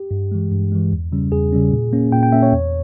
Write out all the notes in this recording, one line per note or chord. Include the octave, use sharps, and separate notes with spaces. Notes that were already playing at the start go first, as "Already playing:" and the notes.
Already playing: G4
G2
E3 G#3
G2
E3 G#3
E2
C#3 G3 C#4
E2 G#4
C#3 G3 C#4
A#2
A#3 C#4
A#2 G5
G5
A#3 C#4 E5
C#5
E2